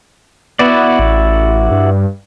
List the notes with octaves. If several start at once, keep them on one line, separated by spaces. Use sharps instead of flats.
B3 E4 F#4 D5
A1
G2